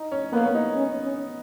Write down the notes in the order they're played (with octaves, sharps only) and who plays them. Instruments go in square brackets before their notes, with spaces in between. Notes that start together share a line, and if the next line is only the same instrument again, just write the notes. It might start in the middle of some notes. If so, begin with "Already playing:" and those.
Already playing: [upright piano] D#4
C#4
[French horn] A#3 [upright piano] B3
[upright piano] C#4
D#4
[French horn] C#4
C#4